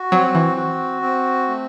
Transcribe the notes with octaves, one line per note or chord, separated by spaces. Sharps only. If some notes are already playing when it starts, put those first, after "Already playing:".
Already playing: F#4
F#3 C4
E3
F#4
C4
A3